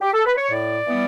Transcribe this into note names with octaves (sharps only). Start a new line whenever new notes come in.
G4
A4
B4
C#5
A2 D5
E3 G3 B3